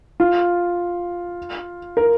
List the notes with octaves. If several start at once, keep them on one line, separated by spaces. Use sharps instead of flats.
F4
A#4